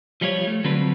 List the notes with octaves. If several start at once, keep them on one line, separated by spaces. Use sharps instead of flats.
F3 G3 F4 G#4 C#5
A3
D3 F#3 C4 D4 F4 B4